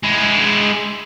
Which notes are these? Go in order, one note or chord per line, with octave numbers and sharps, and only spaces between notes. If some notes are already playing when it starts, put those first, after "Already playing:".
G#3 E4